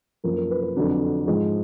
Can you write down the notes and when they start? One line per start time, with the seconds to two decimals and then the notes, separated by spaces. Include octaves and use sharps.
0.24 F#2 F3 A#3 A#4
0.37 A#4
0.51 B4
0.63 B4
0.76 F2 D3 F#3 D4
1.27 G#2 F3 G#3